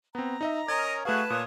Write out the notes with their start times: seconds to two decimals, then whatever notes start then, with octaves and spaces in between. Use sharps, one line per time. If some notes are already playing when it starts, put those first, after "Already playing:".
0.15 B3 C4 A#5
0.41 D#4 D#5 E5
0.68 C#4 A#4 D#5 G#6
1.05 A3 F#4 G#4 B4 F5 A5 F#6
1.30 A#2 F4 C#5 D#6